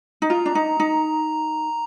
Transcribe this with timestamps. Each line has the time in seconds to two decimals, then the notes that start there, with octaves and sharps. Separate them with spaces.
0.22 D#4
0.30 F4 A#5
0.46 D4
0.55 D#4
0.80 D#4